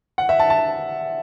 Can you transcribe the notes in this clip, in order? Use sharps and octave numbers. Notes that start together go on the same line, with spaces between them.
F#5
E5
A5
A5